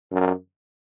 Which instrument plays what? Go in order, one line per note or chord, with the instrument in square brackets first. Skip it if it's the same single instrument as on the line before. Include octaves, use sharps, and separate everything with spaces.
[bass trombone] F#2